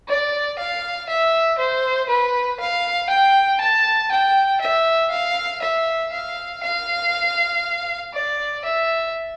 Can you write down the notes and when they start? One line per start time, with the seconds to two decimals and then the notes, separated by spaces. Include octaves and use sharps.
0.08 D5
0.58 F5
1.09 E5
1.58 C5
2.09 B4
2.60 F5
3.09 G5
3.60 A5
4.11 G5
4.61 E5
5.11 F5
5.62 E5
6.12 F5
6.63 F5
8.14 D5
8.64 E5